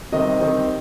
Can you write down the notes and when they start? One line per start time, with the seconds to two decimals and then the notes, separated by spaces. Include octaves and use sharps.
0.12 C3 D#3 G3 C4 D#5
0.41 D#3 G3 C4 D#4